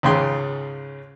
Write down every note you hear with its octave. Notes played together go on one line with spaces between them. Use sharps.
C#2 G#2 C#3 G#3 G5 C6